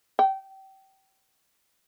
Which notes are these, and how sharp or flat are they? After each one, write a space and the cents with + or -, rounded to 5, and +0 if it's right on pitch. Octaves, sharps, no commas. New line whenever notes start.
G5 -25